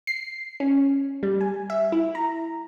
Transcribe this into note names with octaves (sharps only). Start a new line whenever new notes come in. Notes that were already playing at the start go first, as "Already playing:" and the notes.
C7
C#4
G3
G#5
E5
E4
A#5